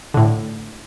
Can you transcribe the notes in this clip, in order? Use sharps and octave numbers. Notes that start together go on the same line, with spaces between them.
A2 D3